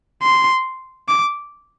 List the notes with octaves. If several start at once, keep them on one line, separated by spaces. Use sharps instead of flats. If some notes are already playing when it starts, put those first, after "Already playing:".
C6
D6